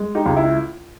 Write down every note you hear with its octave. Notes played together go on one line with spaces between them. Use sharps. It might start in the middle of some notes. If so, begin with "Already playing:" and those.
Already playing: G#3
D#4 G4
C#2
E4